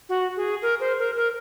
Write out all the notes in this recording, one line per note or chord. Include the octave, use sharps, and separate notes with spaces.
F#4
G#4
A#4
C5
A#4
A#4